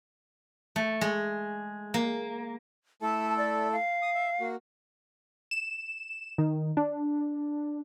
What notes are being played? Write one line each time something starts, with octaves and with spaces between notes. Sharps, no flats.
A3
G#3
A#3
A3 E4 A4 A5
D5
F5
D#6
E5
A#3 F#4
E7
D#3
D4